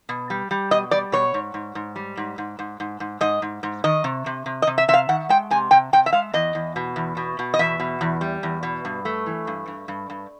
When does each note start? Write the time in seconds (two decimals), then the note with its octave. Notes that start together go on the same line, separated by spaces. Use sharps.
0.09 B2
0.30 G3
0.51 G3
0.71 B2 D#5
0.91 G3 D5
1.12 B2 C#5
1.34 G#2
1.54 G#2
1.75 G#2
1.96 G3
2.17 G#2
2.38 G#2
2.59 G#2
2.80 G#2
3.00 G#2
3.21 G#2 D#5
3.42 G#2
3.63 G#2
3.84 D#3 D#5
4.04 C3
4.26 C3
4.46 C3
4.62 D#5
4.67 C3
4.78 E5
4.88 C3 E5
4.94 F5
5.09 D#3 F#5
5.29 G#3 G5
5.51 C3 G#5
5.71 C3 G5
5.93 C3 G5
6.06 E5
6.13 G#3 F5
6.33 E2 D#5
6.55 E2
6.76 B2
6.96 E2
7.17 B2
7.39 B2
7.54 D#5
7.59 E2 E5
7.80 B2
8.01 E2
8.21 G3
8.43 E2
8.63 B2
8.85 G2
9.05 A3
9.26 E3
9.47 G2
9.67 G2
9.88 G2
10.10 G2